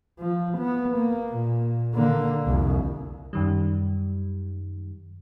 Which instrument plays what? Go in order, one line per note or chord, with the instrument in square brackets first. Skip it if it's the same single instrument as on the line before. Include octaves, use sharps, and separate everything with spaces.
[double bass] F3
B3
A#3
A#2
D3 A#3
C2 F2
[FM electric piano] F#2 D#3 G3